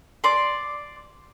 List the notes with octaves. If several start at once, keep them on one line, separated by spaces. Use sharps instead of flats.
D5 C6